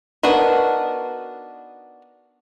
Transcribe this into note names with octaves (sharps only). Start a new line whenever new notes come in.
B3 D4 D#4 F#4 A#4